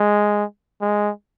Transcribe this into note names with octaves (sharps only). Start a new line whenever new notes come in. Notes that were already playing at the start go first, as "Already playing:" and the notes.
Already playing: G#3
G#3